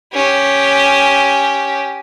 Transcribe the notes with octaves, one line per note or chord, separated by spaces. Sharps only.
C#4 G4